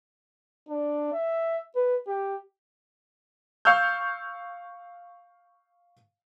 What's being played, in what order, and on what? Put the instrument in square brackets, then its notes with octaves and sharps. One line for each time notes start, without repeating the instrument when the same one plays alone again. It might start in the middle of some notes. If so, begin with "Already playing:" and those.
[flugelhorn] D4
E5
B4
G4
[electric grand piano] F5 C#6 E6 F6 G6